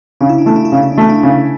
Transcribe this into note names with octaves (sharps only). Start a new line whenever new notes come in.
C#3 D4
E4
D4
A3 E4
D4
E4
C#3 D4
E4
D4
A3 E4
D4
C#3